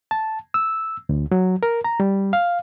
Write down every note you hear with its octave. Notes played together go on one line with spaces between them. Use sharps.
A5
E6
D2
F#3
A#4
A#5
G3
F5